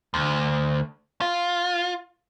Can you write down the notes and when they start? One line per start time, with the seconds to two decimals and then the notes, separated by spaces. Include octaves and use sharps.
0.14 D2
1.21 F4